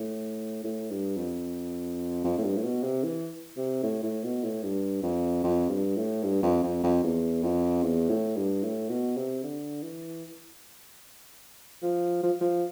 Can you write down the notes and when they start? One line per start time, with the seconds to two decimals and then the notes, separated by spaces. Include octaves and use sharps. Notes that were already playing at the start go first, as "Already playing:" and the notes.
Already playing: A2
0.64 A2
0.91 G2
1.17 F2
2.24 F2
2.38 A2
2.44 G2
2.57 A2
2.64 B2
2.84 C3
3.04 E3
3.57 C3
3.83 A2
4.04 A2
4.24 B2
4.44 A2
4.64 G2
5.03 F2
5.44 F2
5.70 G2
5.97 A2
6.24 G2
6.43 F2
6.63 F2
6.84 F2
7.04 E2
7.43 F2
7.83 E2
8.10 A2
8.37 G2
8.63 A2
8.90 B2
9.17 C3
9.44 D3
9.83 E3
11.83 F3
12.23 F3
12.41 F3